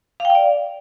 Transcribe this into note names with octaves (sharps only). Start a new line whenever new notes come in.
F5
G5
F5
D5